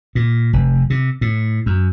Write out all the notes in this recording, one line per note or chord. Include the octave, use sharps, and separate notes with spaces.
A#2
F1
C3
A2
F#2